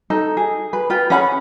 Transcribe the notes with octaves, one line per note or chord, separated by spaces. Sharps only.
D#4 A4
G#4
B4
F4 B4 G5
C#4 G#4 F#5 B5